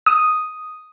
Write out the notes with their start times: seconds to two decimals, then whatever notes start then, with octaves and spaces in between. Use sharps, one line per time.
0.06 D#6